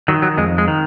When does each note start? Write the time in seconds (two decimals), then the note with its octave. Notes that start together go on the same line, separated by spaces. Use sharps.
0.08 D#3 F#3
0.22 F#3
0.37 F2 G#3
0.58 G#3
0.68 D#3